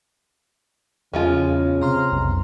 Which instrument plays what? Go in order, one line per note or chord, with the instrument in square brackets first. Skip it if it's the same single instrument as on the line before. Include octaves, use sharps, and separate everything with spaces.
[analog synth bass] E2 [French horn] C#3 [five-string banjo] F3 G#3 F4
[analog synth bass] C3 [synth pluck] A#5 C6 F6
[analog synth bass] B1 [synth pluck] F2